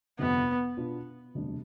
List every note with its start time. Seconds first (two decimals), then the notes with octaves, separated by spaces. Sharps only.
0.19 G1 F2 C3 B3
0.77 B2 B3 D4 F4
1.35 E1 D2 C3 G3 D4